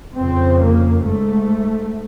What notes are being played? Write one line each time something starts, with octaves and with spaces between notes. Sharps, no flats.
F2 C#3 C4
A#3
G#2 A3